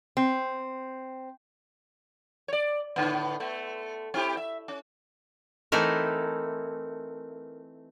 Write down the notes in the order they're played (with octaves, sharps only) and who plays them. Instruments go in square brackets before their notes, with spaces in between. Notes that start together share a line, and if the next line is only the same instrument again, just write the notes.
[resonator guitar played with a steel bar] C4
[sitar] C#5 D5
A2 D3 B3
A3 B3
C4 E4 G4
E5
C#4
[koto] E3 A3 C4 D#4 E4 A#4